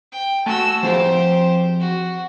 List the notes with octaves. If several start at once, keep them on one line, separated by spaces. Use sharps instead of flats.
G5
A3 F#4 G#5 A5 E6
F3 C4 G4 G#4 C5
F#4